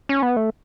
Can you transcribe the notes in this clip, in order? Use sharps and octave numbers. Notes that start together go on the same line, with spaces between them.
C#4
B3
A3